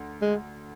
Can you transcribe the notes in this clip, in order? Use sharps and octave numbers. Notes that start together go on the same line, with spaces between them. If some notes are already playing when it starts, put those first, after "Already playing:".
Already playing: D2
G#3